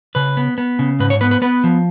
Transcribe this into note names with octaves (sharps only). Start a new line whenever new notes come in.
C#3 B4
B3
B3
C#3
G#2 B4
C#5
B3 B4
B4
B3 B4
F3